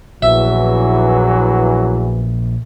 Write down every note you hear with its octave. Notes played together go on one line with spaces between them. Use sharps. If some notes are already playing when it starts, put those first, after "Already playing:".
A#1 E2 E3 F#3 E5